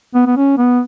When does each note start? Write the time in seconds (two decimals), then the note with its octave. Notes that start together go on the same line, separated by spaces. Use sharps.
0.14 B3
0.26 B3
0.37 C#4
0.58 B3